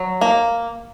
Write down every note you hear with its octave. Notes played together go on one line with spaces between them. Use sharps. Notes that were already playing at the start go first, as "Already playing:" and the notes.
Already playing: F#3
A#3